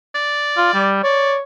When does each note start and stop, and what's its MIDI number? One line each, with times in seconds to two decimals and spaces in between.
0.15 0.89 74
0.57 0.69 65
0.74 1.01 55
1.03 1.40 73
1.03 1.34 74